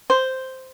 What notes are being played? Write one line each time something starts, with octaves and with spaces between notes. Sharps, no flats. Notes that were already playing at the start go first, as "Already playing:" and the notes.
C5